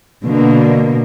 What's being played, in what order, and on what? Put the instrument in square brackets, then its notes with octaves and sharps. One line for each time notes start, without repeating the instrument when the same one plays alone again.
[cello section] B2 D3 A#3